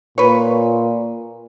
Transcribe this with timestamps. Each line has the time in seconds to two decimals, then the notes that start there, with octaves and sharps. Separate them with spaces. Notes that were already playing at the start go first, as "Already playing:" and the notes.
0.18 A#2 B4 C#5